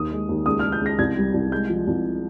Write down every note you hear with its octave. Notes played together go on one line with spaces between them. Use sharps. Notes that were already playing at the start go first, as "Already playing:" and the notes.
Already playing: D#2 D#6
G#3
D#2
C#2 D#6
G#3 F6
G6
C#2 A#6
C2 G#6
G3
C2
G#3 G6
F3
C2